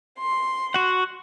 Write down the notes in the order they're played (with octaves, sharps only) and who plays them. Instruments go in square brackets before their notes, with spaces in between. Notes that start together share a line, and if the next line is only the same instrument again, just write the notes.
[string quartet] C6
[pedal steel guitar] F#4 F#5